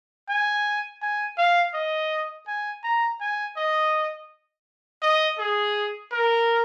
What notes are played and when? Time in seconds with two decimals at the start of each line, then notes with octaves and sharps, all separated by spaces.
0.30 G#5
1.02 G#5
1.38 F5
1.74 D#5
2.47 G#5
2.84 A#5
3.21 G#5
3.57 D#5
5.02 D#5
5.39 G#4
6.12 A#4